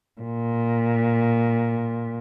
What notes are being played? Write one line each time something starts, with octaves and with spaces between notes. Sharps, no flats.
A#2